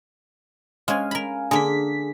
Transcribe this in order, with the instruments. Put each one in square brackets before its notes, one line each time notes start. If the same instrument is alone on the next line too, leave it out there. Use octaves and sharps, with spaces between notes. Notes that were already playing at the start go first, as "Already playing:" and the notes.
[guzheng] G#3 C#4 [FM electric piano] F5 G#5
[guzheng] A#4 B5
[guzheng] D3 A#3 [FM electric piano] G#4 B6